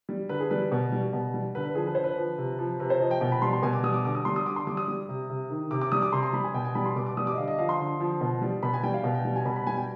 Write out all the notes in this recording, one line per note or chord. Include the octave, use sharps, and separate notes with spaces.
G3
D3 B4
G#4
G3 B4
B2
G3
B2
G3
D3 B4
B4
F3 G#4
B4
D3 C5
B4
F3
C3
F3
C3 B4
C5
F3 D#5
G5
B2 G5
B5
G3 C6
C6
B2 G#5
D6
G3 D#6
D6
D3 D6
D#6
G3 C6
D#6
D3 D6
C6
G3 D6
D#6
G3
C3
C3
D#3
C3 D6
D6
G3 D#6
D6
C3 C6
C6
G3 B5
G#5
B2 G5
G#5
G3 B5
C6
B2 D6
D6
G3 D#6
D6
D#5
D3 F5
D#5
F3 F5
C6
D3
F3
B2
G3
B2 B5
G#5
G3 G5
F5
B2
G5
G3
G#5
B2 B5
B5
G3 G#5
G5